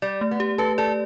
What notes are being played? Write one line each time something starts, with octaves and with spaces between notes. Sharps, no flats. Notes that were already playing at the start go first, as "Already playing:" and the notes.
G3 D5
A3
B3
G4
A4 B4
A4 D5